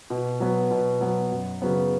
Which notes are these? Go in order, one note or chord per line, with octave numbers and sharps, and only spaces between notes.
B2
F#3 B3
B2
F#3 B3
F#2
C#3 F#3 B3